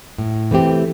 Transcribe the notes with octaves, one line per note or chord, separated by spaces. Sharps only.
A2
E3 A3 C4 G4